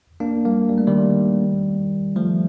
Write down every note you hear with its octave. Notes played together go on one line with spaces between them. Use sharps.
A#3 D4
G3 A#3
G3
A3
D#3 G3
F3 A3